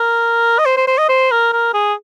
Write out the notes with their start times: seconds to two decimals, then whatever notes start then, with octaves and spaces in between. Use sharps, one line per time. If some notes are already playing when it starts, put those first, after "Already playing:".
Already playing: A#4
0.58 D#5
0.65 C5
0.77 C5
0.87 C5
0.98 D#5
1.09 C5
1.31 A#4
1.53 A#4
1.74 G#4